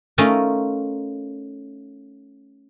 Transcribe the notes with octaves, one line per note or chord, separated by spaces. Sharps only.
A3 C#4 D#4 F4 A#4